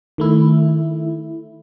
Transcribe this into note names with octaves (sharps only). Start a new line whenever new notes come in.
D#3 A3 E4